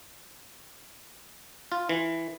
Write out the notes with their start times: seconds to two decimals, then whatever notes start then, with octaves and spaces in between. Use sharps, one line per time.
1.72 F4
1.89 E3